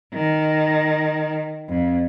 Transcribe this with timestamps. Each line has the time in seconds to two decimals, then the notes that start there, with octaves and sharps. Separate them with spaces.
0.14 D#3
1.69 F2